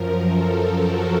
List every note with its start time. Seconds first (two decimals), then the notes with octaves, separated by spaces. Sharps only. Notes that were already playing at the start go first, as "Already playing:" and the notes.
Already playing: F#2 F3 A#4
0.24 A4
0.77 F#4